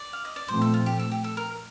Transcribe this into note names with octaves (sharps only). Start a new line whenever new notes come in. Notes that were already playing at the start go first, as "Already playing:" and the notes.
Already playing: D5
F5
D#5
D5
A#2 F3 A3 C4 C5
A4
F4
G4
A4
G4
A4
A#4